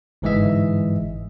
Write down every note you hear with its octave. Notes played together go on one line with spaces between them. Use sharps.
G1 G#2 E3 G#3 D#5 E5